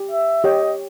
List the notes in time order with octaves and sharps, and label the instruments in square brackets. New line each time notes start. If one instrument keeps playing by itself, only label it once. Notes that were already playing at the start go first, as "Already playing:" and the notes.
Already playing: [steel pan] G4
[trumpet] E5
[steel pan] G4 C#5 G5 [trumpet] D#5